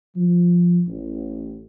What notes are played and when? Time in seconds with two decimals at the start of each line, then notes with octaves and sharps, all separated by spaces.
0.17 F3
0.88 A1